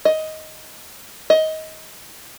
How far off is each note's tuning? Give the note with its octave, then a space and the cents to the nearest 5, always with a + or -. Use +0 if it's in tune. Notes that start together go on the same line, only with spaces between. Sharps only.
D#5 +10
D#5 +20